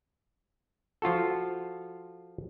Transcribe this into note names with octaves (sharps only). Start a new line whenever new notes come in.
F3 F4 F#4 A4